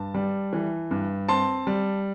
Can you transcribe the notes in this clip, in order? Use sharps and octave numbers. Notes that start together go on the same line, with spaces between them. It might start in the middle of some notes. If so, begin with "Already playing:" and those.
Already playing: G2 A5
G3
E3
G2
C4 A5 C6
G3